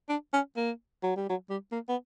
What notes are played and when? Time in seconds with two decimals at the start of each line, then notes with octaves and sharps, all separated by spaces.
0.09 D4
0.33 C#4
0.57 A#3
1.03 F#3
1.16 G3
1.29 F#3
1.50 G3
1.72 A#3
1.89 B3